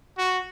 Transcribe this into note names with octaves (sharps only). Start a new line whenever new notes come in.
F#4